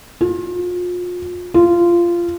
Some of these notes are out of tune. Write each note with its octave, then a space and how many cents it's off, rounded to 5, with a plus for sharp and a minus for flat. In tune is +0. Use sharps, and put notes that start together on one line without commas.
F4 +35
F4 -15